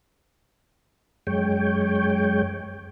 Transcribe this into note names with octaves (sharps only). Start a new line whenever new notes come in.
F#2 G#3 C#5 G5